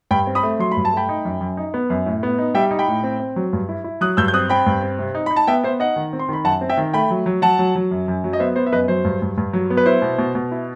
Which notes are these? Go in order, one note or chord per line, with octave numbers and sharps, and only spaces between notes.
G2 G5 B5
C4
B5 D#6
A3
F#3 C6
B5
G2
A5
A3 G5 B5
D#4
F#2
F#2
D#4
B3
F#2
A2
B3
D#4
G3 E5 G5
D#4
G5 B5
A2
C4
C4
F#3
G2
E4
E4
F#3 D#6 F#6
G2 E6 G6
G6
C4 D#6 F#6
C4 G5 B5
G2
C4
C3
D#4
D#4 B5
A5
B3 E5 G5
B3 C5 E5
D#4 D#5 F#5
D#3
C4
C6
D#3 B5
F#2 F#5 A5
C4
E5 G5
D#3
A3 G5 B5
F#3
F#3
F#3 F#5 A5
F#3
F#3
F#2
F#2
F#3
D#5
B3 C5 E5
B3 C5
E5
F#2 B4 D#5
F#3 C5
G2
G2
G2
F#3
B3
B4
E4 C5
B2
B2
B2
E4